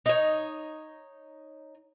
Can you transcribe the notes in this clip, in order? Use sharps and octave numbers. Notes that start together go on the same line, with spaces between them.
D#4 C#5